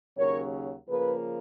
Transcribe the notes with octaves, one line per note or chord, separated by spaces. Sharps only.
D#2 C#3 F#3 A#4 C#5
C#3 F3 A#3 G#4 B4